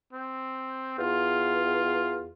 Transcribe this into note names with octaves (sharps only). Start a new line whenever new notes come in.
C4
E2 F4